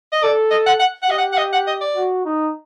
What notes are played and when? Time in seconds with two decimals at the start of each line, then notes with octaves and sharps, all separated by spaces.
0.12 D#5
0.22 A4 D5
0.51 D#5
0.66 F#5
0.80 F#5
1.03 F#5
1.09 G4 D#5
1.18 F#5
1.33 F#5
1.37 D#5
1.53 F#5
1.67 D#5
1.81 D5
1.95 F#4
2.25 D#4